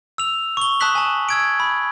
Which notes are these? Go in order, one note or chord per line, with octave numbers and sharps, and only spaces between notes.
E6 F7
C#6 G7
A5 D#6 F#6 B6 F#7
G#5 A5
E6 G#6 D7
B5